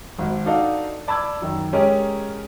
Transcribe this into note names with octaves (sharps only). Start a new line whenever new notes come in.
G#1 F#4
D4 D#4 F#4 A4 D5 F5
D5 A5 B5 D6 E6 G#6
F#2 D#3
G#3 C#4 G4 G#4 A#4 C#5